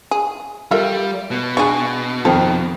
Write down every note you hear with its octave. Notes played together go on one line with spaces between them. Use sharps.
G#4
G3 F4 A4 A#4 E5
B2
G#3 D4 G#4 C#6
F2 D#3 F3 A4